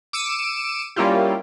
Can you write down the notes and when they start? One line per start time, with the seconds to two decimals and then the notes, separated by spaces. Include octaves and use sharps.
0.13 D6 E6 C#7 D#7 E7
0.96 G3 A#3 C#4 E4 F4 G4